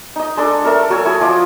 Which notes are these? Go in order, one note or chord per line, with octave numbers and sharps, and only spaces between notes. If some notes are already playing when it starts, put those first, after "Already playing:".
D#4 D#5
G#3 D4 A4
A4 A#4 C#5 E5
F#3 F#4 A4 G#5
E4 G#4
F3 D#5 D6